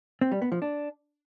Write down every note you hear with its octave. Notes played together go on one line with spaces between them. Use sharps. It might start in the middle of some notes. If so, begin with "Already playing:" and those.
C4
G3
B3
F3
D4